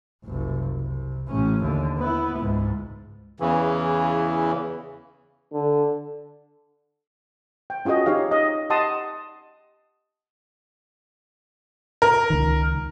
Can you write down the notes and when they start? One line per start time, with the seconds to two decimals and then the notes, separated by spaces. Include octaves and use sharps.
0.25 F#1 C2
0.80 C2
1.28 A1 C#4
1.62 D#2 D3
1.98 B3 E4
2.39 C#2 G#2
3.40 E2 C#3 E3
5.53 D3
7.70 G5
7.85 C#4 F4 F#4 G#4 D#5
8.06 D#4 G4 C#5 F5
8.31 D#5
8.70 G4 D#5 F#5 A5 C6 D#6
12.02 A#4
12.30 C#2 D#3